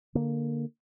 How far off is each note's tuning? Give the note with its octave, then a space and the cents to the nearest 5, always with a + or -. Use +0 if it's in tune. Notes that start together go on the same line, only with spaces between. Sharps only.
D3 +0 A#3 +0